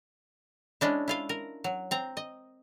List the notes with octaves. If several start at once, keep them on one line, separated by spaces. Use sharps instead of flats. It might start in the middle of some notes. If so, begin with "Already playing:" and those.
G#3 C#4 D4 E4
E4 F4 F5
A#4
F#3
C4 A#5
D#5